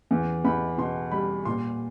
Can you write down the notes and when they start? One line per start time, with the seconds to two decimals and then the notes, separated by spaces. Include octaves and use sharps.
0.11 E2
0.44 E2 B5
0.78 B2 C6
1.11 G3 B5
1.45 A#2 C6